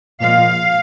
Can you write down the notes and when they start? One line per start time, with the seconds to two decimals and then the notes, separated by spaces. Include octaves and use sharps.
0.20 A#2 F3 G#3 F5